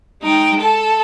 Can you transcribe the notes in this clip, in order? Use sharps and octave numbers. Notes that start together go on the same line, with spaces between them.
G#3 D#4 G5
A4 A5